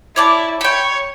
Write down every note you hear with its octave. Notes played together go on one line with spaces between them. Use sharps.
E4 C#5 D5 A5
C#5 G5 B5